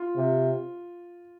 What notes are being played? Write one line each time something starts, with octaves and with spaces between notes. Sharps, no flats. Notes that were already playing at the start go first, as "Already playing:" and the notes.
Already playing: F4
C3